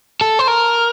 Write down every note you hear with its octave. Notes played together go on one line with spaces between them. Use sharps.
A4
C5
A#4